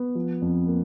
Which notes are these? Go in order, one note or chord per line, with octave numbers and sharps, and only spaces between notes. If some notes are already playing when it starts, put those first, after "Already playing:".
Already playing: B3
F3
F2
A#3